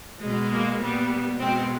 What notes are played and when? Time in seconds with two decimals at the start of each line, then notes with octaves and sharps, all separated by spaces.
0.23 B2 G#3
0.52 A#3
0.82 A#2 G3 B3
1.40 B2 G#3 C4